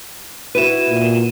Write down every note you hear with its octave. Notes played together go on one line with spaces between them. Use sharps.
E4 F#4 B4 D#7 E7
A#2